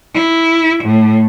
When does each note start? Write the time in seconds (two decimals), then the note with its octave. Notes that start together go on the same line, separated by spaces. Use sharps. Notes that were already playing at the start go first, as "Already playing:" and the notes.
0.14 E4
0.84 A2